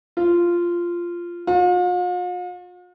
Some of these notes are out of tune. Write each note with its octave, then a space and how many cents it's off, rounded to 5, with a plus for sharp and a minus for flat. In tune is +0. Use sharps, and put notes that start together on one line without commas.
F4 -10
F4 +45